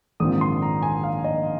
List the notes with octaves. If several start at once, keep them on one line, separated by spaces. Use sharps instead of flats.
A#1 G#2 D#3 C4 F4 D#6
C6
A#5
G#5
F5
D#5